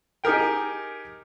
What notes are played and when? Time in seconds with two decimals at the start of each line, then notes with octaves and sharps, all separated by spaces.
0.24 D#4 G4 G#4 A#4 G5